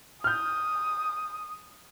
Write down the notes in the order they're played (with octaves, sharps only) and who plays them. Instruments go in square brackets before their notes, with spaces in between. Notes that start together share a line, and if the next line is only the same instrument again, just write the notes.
[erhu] D#6 [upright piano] F6 G6